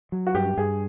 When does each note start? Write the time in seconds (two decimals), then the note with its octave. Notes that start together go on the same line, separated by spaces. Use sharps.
0.12 F#3
0.27 F#4
0.34 G2 G4
0.57 G2 G#4